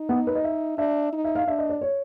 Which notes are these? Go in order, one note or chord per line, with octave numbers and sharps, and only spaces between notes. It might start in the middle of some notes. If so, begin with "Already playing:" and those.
Already playing: D#4
B3
B4
D#5
E5
D4 E5
D#4
E5
F5
D4 E5
D#5
D5
C#5